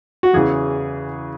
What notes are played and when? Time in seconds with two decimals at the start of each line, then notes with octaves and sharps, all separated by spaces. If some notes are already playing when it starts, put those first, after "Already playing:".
0.23 F#4
0.33 E2 C#3 E3 G#4